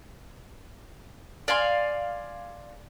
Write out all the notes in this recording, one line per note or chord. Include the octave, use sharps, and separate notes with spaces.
D5 F5 G#5 C6